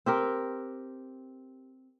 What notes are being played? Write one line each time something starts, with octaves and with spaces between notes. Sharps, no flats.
C4 G4 A#4